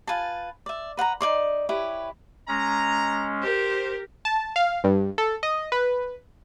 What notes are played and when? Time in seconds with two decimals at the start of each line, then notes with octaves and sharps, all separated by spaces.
0.07 F4 B4 G#5 A5
0.66 D5 E5
0.97 B4 F#5 G5 A#5
1.21 D#4 C#5 D5 C6
1.69 E4 G4 B4 C#5
2.48 G#3 C#4 A#5
3.41 G4 A#4 C5
4.25 A5
4.56 F5
4.84 G2
5.18 A4
5.43 D#5
5.72 B4